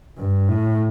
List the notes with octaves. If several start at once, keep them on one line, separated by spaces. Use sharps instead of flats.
G2
A2